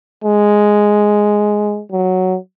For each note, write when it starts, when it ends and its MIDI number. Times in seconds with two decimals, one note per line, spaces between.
0.24 1.82 56
1.92 2.37 54